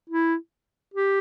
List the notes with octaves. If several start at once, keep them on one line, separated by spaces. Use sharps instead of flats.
E4
G4